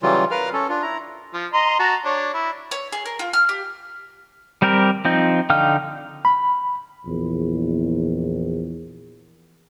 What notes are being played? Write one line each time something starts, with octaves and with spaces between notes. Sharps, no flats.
C#3 E3 F#3 G3 F4
A#4 B4 F5 F6
C#4 A4
D4 F4
E4 A#5
F3
D#5 A#5 C6
F#4 A5 A#5
D4 C#5
E4
C#5
G#4
A#4
F4
F6
G4
G3 C4 G4 A#4
F3 C4 D#4
D3 D#4 F5 G5 F6
B5
A#1 E2